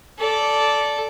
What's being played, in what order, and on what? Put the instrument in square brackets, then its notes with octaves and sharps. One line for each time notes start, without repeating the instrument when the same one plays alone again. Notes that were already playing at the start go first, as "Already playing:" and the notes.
[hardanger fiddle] A4 D5